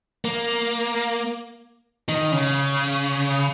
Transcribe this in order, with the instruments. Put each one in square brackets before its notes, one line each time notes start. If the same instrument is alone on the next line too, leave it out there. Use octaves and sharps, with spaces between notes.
[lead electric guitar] A#3
D#3
C#3